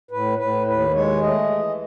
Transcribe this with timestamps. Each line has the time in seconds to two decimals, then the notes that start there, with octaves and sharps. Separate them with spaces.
0.11 A2 B4
0.38 A2 B4
0.67 D#2 B4
0.94 G#3 C#5
1.22 A3 D#5
1.50 E3